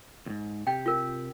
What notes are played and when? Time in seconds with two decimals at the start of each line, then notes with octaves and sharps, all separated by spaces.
0.26 E2 G#2
0.67 C3 G4 G5
0.86 F4 A#4